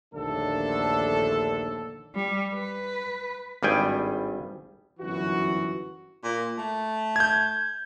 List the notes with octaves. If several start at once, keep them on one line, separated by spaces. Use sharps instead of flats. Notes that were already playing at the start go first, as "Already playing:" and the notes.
A#1 D#2 D3 A3 D4 A4
G3
B4
G#1 G2 G3 G#4 G5 G#5
G1 F#2 E3 F#4
A#2
A3
G6 G#6